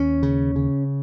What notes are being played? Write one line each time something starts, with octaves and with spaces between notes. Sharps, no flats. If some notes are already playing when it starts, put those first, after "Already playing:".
Already playing: D#2 C#4
C#3
C#3